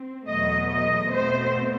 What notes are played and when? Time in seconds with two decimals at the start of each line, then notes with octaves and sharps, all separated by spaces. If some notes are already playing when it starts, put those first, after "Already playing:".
Already playing: C4
0.26 E2 B2 F#3 A3 D#5
0.68 D#5
1.09 B2 A3 C4 C5